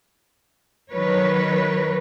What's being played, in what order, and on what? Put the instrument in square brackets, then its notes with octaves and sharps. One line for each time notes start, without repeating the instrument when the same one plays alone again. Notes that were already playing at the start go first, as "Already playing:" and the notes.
[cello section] D#3 F#3 A#4 B4 C#5